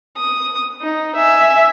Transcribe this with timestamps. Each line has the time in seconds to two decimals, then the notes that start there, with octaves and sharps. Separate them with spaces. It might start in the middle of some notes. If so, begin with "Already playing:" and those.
0.17 D#6
0.82 D#4
1.15 E5 G#5